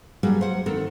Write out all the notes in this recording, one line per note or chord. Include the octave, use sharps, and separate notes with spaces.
F#3 G3 A#3 F#4 G#4
C5 F#5
D#3 C4 A4 A#4 F#5